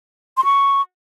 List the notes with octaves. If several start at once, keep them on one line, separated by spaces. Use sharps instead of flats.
C6
C#6